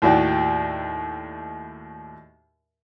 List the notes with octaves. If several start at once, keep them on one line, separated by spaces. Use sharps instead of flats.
D#2 A2 F#4 D5 G5